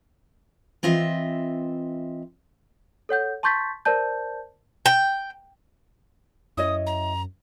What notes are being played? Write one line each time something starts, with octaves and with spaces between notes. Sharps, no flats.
E3 C4 F4 D#5 E5
A4 C#5 F#5 G6
A5 C6 C#6 G6 A6 B6
A#4 C5 D5 A5 G6
G5
F#2 E4 C#5 D#5 D#6
A#5